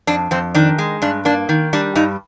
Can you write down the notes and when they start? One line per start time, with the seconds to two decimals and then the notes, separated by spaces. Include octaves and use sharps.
0.07 F2 D4
0.31 F2 C4
0.54 D#3 D4
0.78 G#3
1.02 G2 D4
1.25 A#3 D4
1.49 D#3
1.73 G3 D4
1.95 G2 D#4